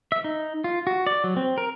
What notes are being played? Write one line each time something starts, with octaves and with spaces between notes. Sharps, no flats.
E5
D#4
F4
F#4
D5
F#3
C4
A#4